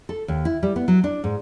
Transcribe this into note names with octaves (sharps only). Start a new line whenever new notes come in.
A4
D#2
E4
G3
B3
F#3
D4
G#2